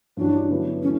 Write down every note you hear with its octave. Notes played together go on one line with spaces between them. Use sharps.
G2 E3 G3 C#4 D4 F#4
D3 F#3 B3 E4
E3 A3 C#4